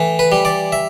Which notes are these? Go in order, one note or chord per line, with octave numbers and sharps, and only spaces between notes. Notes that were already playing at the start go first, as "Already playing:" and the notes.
Already playing: A2 E3
B4
G3
D5
E5